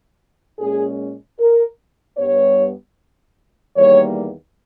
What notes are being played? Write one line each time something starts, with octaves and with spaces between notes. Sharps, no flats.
A#2 G#3 C#4 G#4
A#4
G2 G3 B3 C#5
E2 D#3 G3 A#3 C#5